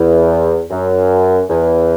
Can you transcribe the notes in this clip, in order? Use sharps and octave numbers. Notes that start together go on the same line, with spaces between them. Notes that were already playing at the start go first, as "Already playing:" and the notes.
Already playing: E2
F#2
E2